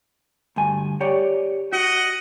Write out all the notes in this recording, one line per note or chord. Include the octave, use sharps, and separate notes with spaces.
D2 G2 G#5
G4 C#5 D5
F#4 D#5 F#5